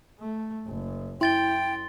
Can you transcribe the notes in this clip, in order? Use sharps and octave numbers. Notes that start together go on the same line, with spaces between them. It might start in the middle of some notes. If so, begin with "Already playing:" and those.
A3
F#1
F#2 E4 G5 C6 A6 G7